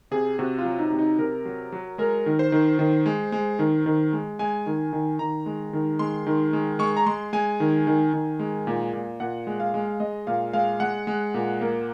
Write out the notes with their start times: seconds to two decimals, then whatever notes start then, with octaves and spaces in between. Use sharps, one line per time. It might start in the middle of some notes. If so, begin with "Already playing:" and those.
0.11 C3 G#4
0.39 C3 F#4
0.59 F4
0.65 F#3
0.79 D#4
0.92 C3
0.99 D#4
1.19 C3 A#4
1.45 F#3
1.72 F#3
1.98 G#3 A#4
2.26 D#3
2.39 C5
2.52 D#3
2.79 D#3
3.06 G#3
3.32 G#3
3.59 D#3
3.86 D#3
4.13 G#3
4.39 G#3 G#5
4.66 D#3
4.93 D#3
5.19 D#3 A#5
5.46 G#3
5.73 D#3
5.99 G#3 C6
6.27 D#3
6.53 G#3
6.79 G#3 C#6
6.97 A#5
7.06 G#3 C6
7.33 G#3 G#5
7.60 D#3
7.87 D#3
8.14 D#3
8.39 G#3
8.67 A#2
8.93 A#2
9.20 A#2 F#5
9.47 G#3
9.60 F5
9.74 G#3
10.00 G#3 D#5
10.27 A#2 F5
10.53 G#3 F5
10.80 G#3 F#5
11.07 G#3
11.34 A#2
11.61 A#3